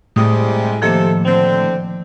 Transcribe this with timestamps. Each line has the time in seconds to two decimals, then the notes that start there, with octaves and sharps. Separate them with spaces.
0.16 A2 C3 G3 G#3 D#6
0.82 C3 D#3 F3 A#3 A4
1.25 D3 C4